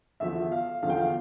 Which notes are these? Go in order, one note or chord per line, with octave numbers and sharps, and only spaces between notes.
E2 D3 F3 E5
F5
E2 D3 F3 F5
G5
F5